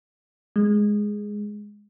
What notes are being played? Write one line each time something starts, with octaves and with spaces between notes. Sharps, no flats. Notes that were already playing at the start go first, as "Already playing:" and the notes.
G#3